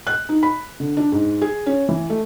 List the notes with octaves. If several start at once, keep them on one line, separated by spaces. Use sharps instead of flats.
F#6
D#4
B5
D3
D4
G#2
G#4
C#4
E3
A3